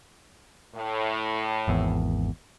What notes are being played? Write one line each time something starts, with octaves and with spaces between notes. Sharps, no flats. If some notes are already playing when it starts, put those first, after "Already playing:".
A2
G#1 E2